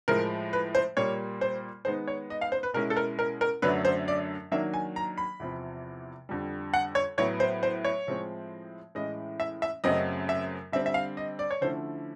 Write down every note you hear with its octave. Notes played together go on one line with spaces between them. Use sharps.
A2 F3 G#3 A#4
B4
C5
A#2 G3 A#3 C#5
C5
D#3 G#3 B3 D#4 C5
C#5
D#5
F5
C5
B4
B2 G#3 C#4 E4 A#4
A4
A#4
A#4
A#4
F#2 D3 F#3 A3 D4 B4
C5
D5
D#3 F#3 A#3 D4 E5
G#5
A#5
B5
E2 C3 F3
F2 D3 G3
F#5
C#5
A2 F#3 B3 C#5
C5
C5
C#5
A2 F3 G#3 C4
A2 E3 G#3 C#4 D#5
E5
E5
F#2 C#3 F#3 A3 C4 D#5
E5
D3 G3 C4 E5
E5
F5
D#5
D5
C#5
D3 F3 A3 C#4 E4 C5